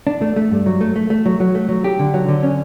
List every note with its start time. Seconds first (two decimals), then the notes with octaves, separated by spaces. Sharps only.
0.07 D4
0.21 A3
0.36 A3
0.51 G2
0.66 F#3
0.81 A3
0.96 A3
1.10 A3
1.26 F#3
1.40 F#3
1.55 A3
1.69 F#3
1.84 G4
1.99 D3
2.14 F#3
2.28 D3
2.43 C#4